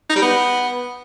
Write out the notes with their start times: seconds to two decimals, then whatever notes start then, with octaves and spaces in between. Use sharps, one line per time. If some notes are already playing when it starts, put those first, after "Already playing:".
0.10 D#4
0.16 G3
0.22 B3